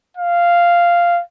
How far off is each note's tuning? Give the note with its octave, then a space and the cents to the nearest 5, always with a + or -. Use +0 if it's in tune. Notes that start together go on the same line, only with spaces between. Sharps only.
F5 -10